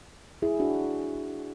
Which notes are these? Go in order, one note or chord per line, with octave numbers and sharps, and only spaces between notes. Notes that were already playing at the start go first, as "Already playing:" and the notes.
E4 G#4
D4 F#4